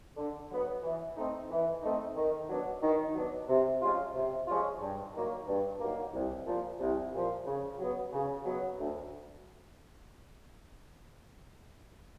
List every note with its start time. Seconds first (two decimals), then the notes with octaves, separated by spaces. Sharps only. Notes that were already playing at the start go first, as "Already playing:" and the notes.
0.17 D3
0.50 F#3 B3
0.83 E3
1.16 A3 C4 D#4
1.50 E3
1.83 A3 C4 D#4
2.16 D#3
2.49 F#3 B3 D4
2.82 D#3
3.15 F#3 B3 D4
3.48 C3
3.81 F3 G#3 C#4 F4
4.15 C3
4.48 F3 G#3 C#4 F4
4.81 G2
5.14 D#3 F#3 A#3
5.48 G2
5.81 D#3 F#3 A#3
6.13 C2
6.47 A#2 F3
6.80 C2
7.13 A#2 F3
7.46 C#3
7.79 F#3 B3
8.12 C#3
8.46 F#3 B3
8.79 D2